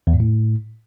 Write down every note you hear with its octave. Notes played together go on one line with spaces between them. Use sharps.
E2
G#2
A2